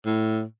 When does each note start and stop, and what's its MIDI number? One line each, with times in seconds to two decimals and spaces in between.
0.06 0.43 45